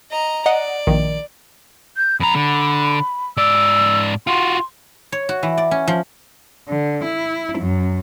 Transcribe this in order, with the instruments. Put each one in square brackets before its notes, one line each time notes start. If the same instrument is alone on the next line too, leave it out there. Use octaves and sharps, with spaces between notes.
[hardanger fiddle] D#5 A#5
[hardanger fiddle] D5 [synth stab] D#5 F#5
[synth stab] A#1 D#3
[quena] G6
[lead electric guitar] F2 A#5 [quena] B5
[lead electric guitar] D3
[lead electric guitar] G#2 D5 [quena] E6
[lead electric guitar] F4 F#4 [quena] C6
[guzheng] C#5
F#4
E3
D5
C#4
F3
[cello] D3
E4
F#2